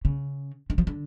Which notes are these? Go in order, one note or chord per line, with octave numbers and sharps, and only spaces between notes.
C#3
D3
F3
D3